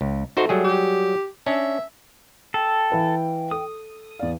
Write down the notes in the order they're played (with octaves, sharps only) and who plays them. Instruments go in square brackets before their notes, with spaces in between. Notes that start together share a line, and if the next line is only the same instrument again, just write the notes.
[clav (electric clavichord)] C#2
[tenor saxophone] A3 [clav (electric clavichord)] D#4 F#4 C5
[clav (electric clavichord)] F#3 G3 G#4
[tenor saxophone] G4
[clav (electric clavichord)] C#4 D4 [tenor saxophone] E5
[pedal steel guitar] A4 [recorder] G5
[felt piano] E3 B4 F5
[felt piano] A4 [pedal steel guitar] D#6
[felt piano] E2 F5 [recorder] D5